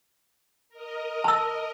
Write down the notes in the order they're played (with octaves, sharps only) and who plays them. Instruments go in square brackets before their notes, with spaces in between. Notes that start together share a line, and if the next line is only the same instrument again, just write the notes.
[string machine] A#4 D#5
[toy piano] A5 E6